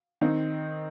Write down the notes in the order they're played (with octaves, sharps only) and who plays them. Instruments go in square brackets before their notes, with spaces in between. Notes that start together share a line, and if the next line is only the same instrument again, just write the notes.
[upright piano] D#3 C4 D#4